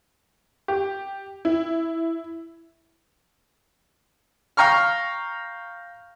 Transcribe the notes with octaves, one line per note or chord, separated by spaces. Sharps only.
G4
E4
F5 G5 A#5 C#6 F6